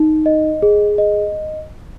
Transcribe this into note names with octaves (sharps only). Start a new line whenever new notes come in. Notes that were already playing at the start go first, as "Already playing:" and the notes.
Already playing: D#4
D#5
G#4
D#5